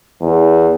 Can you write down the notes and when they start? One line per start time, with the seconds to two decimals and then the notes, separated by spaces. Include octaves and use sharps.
0.21 E2